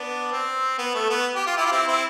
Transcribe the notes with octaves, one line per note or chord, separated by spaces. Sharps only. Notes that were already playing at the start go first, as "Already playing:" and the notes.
Already playing: B3 D4
C4
B3
A3
B3
G4
F4
E4 G4
F4
C4 E4
C4 E4